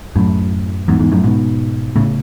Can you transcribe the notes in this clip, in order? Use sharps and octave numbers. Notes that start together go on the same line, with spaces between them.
F#2 A2
E2 G#2
E2 G#2
F#2 A2
G#2 B2
A2 C#3